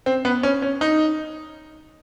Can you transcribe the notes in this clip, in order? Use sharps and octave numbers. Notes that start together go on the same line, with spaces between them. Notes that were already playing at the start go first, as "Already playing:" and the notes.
C4
B3
C#4
C#4
D#4